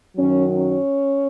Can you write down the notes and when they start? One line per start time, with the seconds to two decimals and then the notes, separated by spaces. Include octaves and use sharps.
0.16 F#2 D#3 F#3 C#4
0.56 C#4